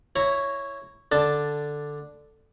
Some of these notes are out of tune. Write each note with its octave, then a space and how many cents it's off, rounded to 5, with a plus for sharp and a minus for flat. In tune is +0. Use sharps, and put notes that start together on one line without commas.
E4 +0 C#5 +0 A#5 -10
D3 +0 D4 +0 A5 +0